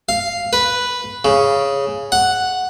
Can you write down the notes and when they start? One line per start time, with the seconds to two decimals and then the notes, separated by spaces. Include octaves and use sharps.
0.09 F5
0.53 B4
1.25 C#3
2.12 F#5